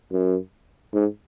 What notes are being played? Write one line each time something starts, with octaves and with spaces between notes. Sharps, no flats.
F#2
G#2